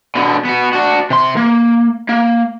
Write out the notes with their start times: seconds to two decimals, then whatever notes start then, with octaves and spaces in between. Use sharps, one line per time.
0.16 B2 D3
0.45 B3 F#4
0.73 D4 F#4
1.10 C3 C6
1.37 A#3
2.09 A#3